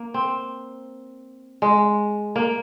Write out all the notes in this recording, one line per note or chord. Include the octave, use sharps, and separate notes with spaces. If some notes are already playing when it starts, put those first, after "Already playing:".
Already playing: A#3
C4
G#3
A#3